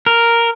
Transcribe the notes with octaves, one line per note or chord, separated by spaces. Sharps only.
A#4